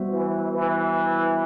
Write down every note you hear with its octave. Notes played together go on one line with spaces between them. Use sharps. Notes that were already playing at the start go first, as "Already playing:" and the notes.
Already playing: G3 B3 F#4 C5 E5
E3
E3